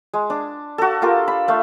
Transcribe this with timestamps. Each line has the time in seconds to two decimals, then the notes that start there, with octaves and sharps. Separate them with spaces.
0.13 G#3
0.30 D4
0.78 F#4 A4
1.02 F4 G4 A4 A#4
1.28 B5
1.48 A3 F5